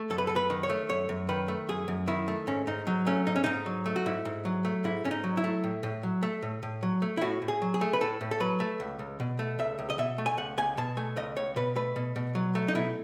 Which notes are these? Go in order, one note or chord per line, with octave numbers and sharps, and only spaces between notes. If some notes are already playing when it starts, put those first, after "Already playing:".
Already playing: A3
F#2 A4
B4
F#2 A4
B4
D#3
C#5
A3
F#2 C#5
F#2
D#3 B4
A3
F#2 G#4
F#2
D#3 E4
A3
G#2 C#4
G#2 D#4
F#3 D#4
A3 C#4
G#2 D#4
C#4
G#2 D#4
F#3
A3
F#4
G#2 E4
G#2
F#3
A3
G#2 E4
G#2 C#4
D#4
F#3
E4
A3
A2
A2
F#3
A3
A2
A2
F#3
A3
E4
A2 F#4
A2
G#4
F#3
G#4
A3
B4
A2 A4
A2
A4
F#3 B4
A3
C#2
C#2
B2
A3
C#2 E5
C#2
D#5
B2 E5
A3
G#5
C#2 F#5
C#2 G#5
B2 A5
A3 G#5
C#2 D#5
C#2 C#5
B2 B4
A3 B4
B2
B2
F#3
A3
D#4
B2 E4